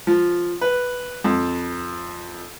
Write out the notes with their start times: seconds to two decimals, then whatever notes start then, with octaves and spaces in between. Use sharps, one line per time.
0.07 F3
0.61 B4
1.24 F2